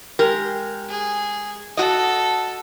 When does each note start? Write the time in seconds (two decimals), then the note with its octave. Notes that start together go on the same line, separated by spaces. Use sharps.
0.19 G#3 G4 A#4
0.89 G#4
1.77 F#4 A4 D#5